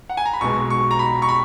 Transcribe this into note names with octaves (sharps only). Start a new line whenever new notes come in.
F#5
G#5
A#5
B5
B1 B2 G#3 C#6
C#6
A#5
B5
C#6
B5